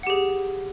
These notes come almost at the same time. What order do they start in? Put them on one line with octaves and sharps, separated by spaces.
F#5 G4 G#4